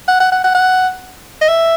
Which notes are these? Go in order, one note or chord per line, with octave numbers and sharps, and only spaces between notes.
F#5
F#5
F#5
F#5
F#5
D#5
E5